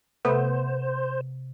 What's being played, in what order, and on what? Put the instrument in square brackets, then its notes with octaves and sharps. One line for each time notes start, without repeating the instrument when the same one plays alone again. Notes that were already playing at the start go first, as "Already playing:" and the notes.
[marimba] C3 [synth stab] A3 B3 [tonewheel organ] C5